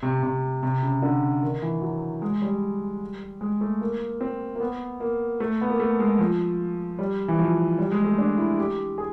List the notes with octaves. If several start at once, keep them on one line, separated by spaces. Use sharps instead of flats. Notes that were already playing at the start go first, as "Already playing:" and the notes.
C3
C3
C3
C#3
D3
D#3
E3
F#3
G#3
G3
G#3
A3
A#3
C4
A#3
B3
A#3
A3
B3
A#3
A3
G#3
F3
G3
E3
F3
G3
G#3
A3
D4
E4
G4
G#4